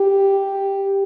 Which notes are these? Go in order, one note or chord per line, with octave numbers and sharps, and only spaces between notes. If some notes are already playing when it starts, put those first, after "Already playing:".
Already playing: G4